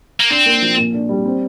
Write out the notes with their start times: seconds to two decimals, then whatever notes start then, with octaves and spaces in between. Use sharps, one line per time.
0.20 A#3
0.30 C4 D4
0.46 A#3
0.62 F3
0.77 A#2
0.94 D4
1.09 G3
1.26 C4